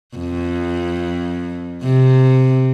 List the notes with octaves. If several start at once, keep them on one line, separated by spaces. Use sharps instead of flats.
F2
C3